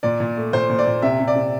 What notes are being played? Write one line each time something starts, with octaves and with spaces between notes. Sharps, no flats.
A#2 D5
A#2
A3
A#2 C5
A#2
D5
A#2
C3 E5
C3
D5
C3